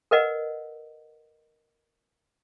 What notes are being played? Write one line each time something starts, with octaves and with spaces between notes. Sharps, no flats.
A#4 B4 D#5 F#5